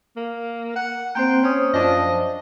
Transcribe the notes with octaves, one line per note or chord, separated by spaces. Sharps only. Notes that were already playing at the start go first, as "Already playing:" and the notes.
A#3
F#5
A#3 C4 C5 G5
C#4 C5 D#6
F#2 F3 D4 D#5